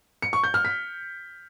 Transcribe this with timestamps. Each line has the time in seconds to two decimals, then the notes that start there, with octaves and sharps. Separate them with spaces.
0.22 C#7
0.33 C#6
0.44 G6
0.54 F6
0.65 B6